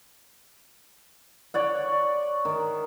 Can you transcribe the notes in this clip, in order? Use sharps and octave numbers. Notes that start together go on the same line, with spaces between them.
C#5 D5 F#5
D#3